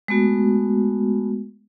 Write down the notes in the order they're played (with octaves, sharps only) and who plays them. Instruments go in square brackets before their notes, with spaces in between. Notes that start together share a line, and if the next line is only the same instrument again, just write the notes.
[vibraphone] G#3 A3 B3 F#4